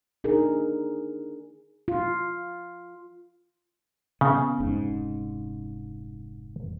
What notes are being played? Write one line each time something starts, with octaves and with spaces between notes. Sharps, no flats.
D4 D#4 G#4 A#4
F4
C#3 B3
F1 G#2 C#4